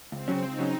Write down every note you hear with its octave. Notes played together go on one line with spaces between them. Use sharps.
C#2 C4
C#3 F#3 C#4
C#2 D#4
C#3 F#3 C#4